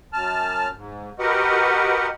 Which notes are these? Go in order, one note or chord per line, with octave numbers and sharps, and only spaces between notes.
F#2 A5 F6
G#2
F#4 G4 A#4 B4 D#5 F#5